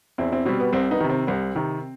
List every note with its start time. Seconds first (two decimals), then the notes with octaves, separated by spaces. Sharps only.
0.18 E2 C4 E4
0.32 C4 E4
0.45 B2 G3 C4
0.60 B3
0.73 C2 C4
0.91 B3 D#4
1.00 C3 D#3
1.09 C4
1.27 C2 C4
1.55 C3 D#3